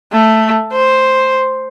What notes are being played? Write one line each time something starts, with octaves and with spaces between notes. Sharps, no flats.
A3
C5